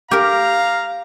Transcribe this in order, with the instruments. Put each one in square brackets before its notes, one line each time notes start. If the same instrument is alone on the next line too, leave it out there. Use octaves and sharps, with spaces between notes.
[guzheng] G4 A#4 [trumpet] F5 [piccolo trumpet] A#5